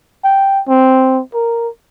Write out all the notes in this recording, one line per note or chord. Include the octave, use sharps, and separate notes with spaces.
G5
C4
A#4